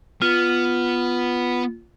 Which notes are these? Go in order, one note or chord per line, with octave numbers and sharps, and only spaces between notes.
B3 F4